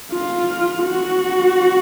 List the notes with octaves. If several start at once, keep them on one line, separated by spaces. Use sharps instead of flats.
F4
F#4